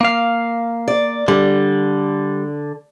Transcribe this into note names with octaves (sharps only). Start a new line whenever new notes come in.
A#3 F5
D5
D3 G3